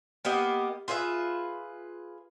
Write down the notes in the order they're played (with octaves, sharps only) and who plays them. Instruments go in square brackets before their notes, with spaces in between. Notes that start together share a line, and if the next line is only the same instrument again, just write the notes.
[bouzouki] A#3 B3 G4 D#5
F4 G#4 B4 E5